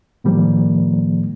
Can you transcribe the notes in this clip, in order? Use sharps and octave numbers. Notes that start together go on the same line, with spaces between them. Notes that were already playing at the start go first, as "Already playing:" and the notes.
A2 D#3 F3 G3 A#3